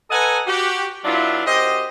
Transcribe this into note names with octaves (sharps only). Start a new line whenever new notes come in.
A4 B4 D#5 F#5 G#5 A#5
F#4 G4
F#3 B3 D4 E4 F4
F#2 G4 C5 D#5